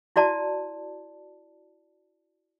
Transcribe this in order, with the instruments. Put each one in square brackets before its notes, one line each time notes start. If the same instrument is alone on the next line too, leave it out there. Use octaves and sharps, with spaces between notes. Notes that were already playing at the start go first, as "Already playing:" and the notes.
[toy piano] E4 F#4 D5 A5